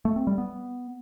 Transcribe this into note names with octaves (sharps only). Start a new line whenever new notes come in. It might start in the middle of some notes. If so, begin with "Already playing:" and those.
A3
C4
G3
B3